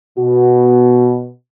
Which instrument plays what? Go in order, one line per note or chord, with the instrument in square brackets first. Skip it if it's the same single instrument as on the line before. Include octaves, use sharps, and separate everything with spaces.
[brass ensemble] B2 [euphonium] F#4